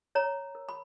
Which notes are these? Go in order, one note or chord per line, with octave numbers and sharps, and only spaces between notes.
C#5 A#5
A#4
B5